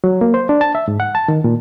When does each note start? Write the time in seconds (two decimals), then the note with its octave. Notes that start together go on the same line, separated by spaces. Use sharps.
0.04 F#3
0.21 A#3
0.34 C5
0.49 D4
0.61 A5
0.75 E5
0.88 G#2
1.00 F#5
1.15 A5
1.28 D#3
1.44 A#2